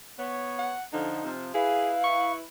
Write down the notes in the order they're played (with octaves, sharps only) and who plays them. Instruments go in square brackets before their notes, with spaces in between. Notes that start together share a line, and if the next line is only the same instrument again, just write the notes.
[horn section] B3 C#5
[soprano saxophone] F#5
[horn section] D3 F3 [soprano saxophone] D#4
[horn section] C3 F3
[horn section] E4 B4 [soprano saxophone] G#4 [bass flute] F5
[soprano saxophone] C#6